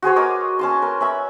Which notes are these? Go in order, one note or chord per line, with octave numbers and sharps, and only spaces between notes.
F#4 G#4 C5 C#5
A#4 D#5 D6 D#6
C#4 A5 C6
A#4
C#4 E5 B5